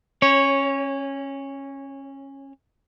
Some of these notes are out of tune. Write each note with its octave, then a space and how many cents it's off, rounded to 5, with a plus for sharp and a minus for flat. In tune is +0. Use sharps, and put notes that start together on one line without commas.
C#4 -20 C#5 +0